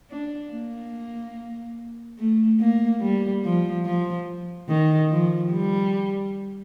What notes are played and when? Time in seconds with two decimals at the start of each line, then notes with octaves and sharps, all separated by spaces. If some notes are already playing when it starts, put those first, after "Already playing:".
0.10 D4
0.52 A#3
2.19 A3
2.60 A#3
3.01 G3
3.44 F3
3.85 F3
4.69 D#3
5.10 F3
5.52 G3